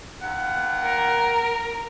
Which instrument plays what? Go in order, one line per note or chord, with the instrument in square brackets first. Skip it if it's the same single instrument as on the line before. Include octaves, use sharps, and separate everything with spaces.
[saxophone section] D#2 F#5
[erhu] A#4